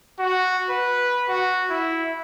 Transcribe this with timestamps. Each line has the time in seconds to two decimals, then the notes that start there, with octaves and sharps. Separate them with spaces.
0.18 F#4
0.69 B4
1.28 F#4
1.70 E4